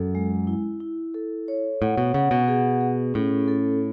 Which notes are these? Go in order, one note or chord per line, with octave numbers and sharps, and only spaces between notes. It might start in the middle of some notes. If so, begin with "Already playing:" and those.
Already playing: F#2 A4
G#3
E4
E4
A4
C#5
A2 F#5
B2
C#3 F#5
B2
G#4
G#4
A2 C#4
A4